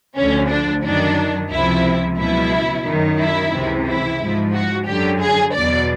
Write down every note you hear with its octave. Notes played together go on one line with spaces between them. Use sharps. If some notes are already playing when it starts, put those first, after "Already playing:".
D2 D3 F3 C#4
D4
F#2 D#3 F#3 D4
C#2 C3 F3 E4
C#2 B2 F#3 E4
F#2 D#3 F#3
E4
C#2 C3 E3
E4
G#2 F3
F#4
F#2 D3 F#3 G4
G#4
E2 B2 F#3 D5